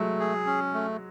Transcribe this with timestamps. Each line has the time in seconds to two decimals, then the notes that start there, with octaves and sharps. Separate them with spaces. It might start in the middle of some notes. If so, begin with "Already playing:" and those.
Already playing: F#3 G#3 A3
0.20 G#4
0.46 C#4
0.74 A3